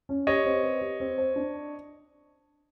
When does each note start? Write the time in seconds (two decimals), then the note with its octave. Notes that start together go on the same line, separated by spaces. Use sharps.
0.09 C#4
0.27 G4 C#5 D#5
0.46 C4
0.63 B4
0.81 G4
1.00 C4
1.18 C5
1.36 D4